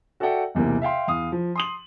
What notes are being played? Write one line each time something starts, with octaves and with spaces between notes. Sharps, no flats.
F#4 A4 D5 E5 F#5 G5
B1 E2 C3 A#3
E5 F5 G5 C6
E2 F5 D#6
F3
C6 D#6 F#7